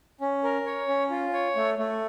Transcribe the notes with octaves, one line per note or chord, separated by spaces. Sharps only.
C#4
A#4
C#5
C#4
F4
C#5
A3
A3